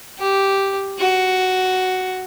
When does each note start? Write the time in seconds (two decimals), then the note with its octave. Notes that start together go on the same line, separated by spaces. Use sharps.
0.19 G4
0.98 F#4